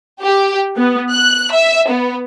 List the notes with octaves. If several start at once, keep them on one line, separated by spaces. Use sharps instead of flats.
G4
B3
F#6
E5
B3